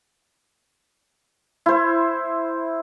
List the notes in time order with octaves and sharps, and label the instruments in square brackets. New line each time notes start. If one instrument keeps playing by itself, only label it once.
[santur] E4 C5